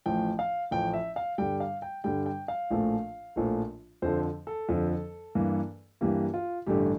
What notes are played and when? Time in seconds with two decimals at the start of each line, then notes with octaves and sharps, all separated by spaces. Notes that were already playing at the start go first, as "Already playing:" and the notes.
0.06 A1 A2 F3 G5
0.39 F5
0.71 A1 A2 F3 G5
0.93 E5
1.16 F5
1.38 G2 D3 G3 G5
1.60 F5
1.82 G5
2.04 G2 D3 G3 G5
2.26 G5
2.48 F5
2.71 A#1 A2 F3 A3
3.36 A#1 A2 F3 A3
4.02 F2 D3 F3 C5
4.47 A4
4.69 F2 D3 F3
5.35 G2 E3 A#3
6.01 G2 E3 A#3 G4
6.34 F4
6.66 A1 G2 D3 A3 G4